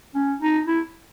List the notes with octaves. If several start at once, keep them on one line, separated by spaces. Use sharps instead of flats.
C#4
D#4
E4